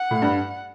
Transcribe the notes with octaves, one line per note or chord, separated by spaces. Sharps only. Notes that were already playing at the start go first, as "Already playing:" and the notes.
Already playing: F#5
A2
G2